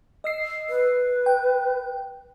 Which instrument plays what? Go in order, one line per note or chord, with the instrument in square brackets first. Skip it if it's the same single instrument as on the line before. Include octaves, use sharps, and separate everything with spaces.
[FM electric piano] D#5 E6 C7
[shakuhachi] B4
[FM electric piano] G5